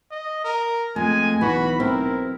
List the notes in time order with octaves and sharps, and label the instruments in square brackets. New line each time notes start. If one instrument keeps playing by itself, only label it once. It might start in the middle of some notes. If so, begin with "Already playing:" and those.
[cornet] D#5
A#4
[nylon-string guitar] F2 [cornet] G#3 [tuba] A3 [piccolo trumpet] G#5
[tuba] B1 [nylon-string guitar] E3 [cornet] F#4 [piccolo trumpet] B5
[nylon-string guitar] C4 [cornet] E4 [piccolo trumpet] A#4